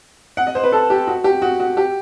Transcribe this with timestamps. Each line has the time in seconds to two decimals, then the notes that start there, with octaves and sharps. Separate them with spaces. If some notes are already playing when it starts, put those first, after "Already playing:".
0.37 F#5
0.47 D#5
0.55 C5
0.64 B4
0.72 A4
0.90 G4
1.07 F#4
1.24 G4
1.42 F#4
1.60 F#4
1.77 G4